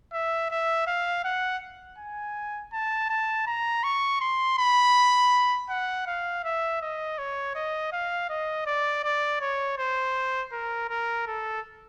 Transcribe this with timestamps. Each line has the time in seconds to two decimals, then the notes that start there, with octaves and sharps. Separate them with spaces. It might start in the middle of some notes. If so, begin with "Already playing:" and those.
0.13 E5
0.51 E5
0.87 F5
1.24 F#5
1.99 G#5
2.73 A5
3.10 A5
3.47 A#5
3.84 C#6
4.21 C6
4.58 B5
5.70 F#5
6.07 F5
6.44 E5
6.82 D#5
7.19 C#5
7.55 D#5
7.93 F5
8.30 D#5
8.66 D5
9.04 D5
9.41 C#5
9.78 C5
10.53 A#4
10.89 A#4
11.27 A4